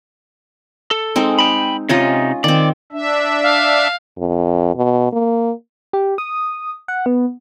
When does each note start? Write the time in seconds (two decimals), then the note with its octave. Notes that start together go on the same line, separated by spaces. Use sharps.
0.91 A4
1.16 G#3 C4 D#4
1.39 G5 B5
1.89 C3 C#4 D#4 F4 D#5
2.44 D#3 C4 D5
2.92 D4 E5
3.43 F5
4.18 F2
4.76 B2
5.13 A#3
5.93 G4
6.18 D#6
6.88 F#5
7.06 B3